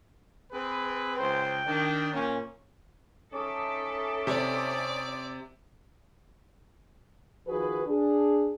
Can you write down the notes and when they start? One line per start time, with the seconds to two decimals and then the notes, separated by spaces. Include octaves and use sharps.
0.52 C4 G#4 B4
1.18 C#2 C5 G5
1.66 D#3 D4
2.14 A#2 A#3 C#4
3.33 C#4 D#4 A4 E5 D6
4.27 C3 D5
7.47 D#3 F3 F#4 G#4 B4
7.87 D4 G#4